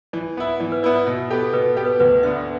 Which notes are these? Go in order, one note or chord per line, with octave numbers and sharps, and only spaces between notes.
E3 D5
B3 E4
E3 D5
B4
B3 E4 D5
D5
B2
B3 G4 A4
B2 B4
B3 G4
B4
D2 B4
D3 B3 E5